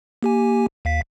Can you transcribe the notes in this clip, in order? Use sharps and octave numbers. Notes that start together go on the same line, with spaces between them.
A#3 G4 G#5
D#2 F5 B6